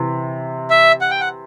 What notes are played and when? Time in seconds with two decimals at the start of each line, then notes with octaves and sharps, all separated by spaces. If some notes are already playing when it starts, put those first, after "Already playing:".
Already playing: C3 E3
0.70 E5
1.01 F#5
1.11 G5
1.20 F#5